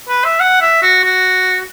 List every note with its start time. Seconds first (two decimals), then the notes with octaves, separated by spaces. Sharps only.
0.09 B4
0.25 E5
0.40 F#5
0.61 E5
0.82 F#4
1.04 F#4